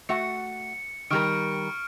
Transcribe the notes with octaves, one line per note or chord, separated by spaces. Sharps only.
A3 F#4 F#5 C#7
D#3 G3 A#4 C#6 F6 D7